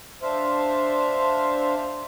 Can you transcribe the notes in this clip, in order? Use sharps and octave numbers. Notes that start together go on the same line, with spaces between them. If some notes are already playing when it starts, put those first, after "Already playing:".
D4 C5 E5 F5